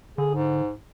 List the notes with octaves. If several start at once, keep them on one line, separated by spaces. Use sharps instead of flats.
D3 G#4
G#2